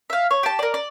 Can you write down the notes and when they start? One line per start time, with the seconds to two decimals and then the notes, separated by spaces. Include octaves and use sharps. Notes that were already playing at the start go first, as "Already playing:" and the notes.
0.10 E5 F5
0.31 C#5
0.43 G4 A5
0.59 A#4 D5
0.74 D5